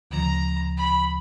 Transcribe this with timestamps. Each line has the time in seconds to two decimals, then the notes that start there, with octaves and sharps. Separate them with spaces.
0.11 D2 C#3 F3 A#5
0.77 B5